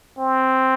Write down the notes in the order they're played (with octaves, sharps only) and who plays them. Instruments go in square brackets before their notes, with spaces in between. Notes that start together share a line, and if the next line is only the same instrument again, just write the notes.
[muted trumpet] C4